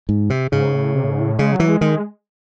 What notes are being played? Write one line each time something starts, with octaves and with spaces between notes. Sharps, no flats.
G#2
C3
G#2 C#3
A2
C3
A2
G#2
A2
C#3 G#3
F#3
E3
G#3
D#3 G#3